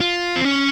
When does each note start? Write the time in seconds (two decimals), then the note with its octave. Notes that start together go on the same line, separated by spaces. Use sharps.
0.01 F4
0.36 C4
0.44 C#4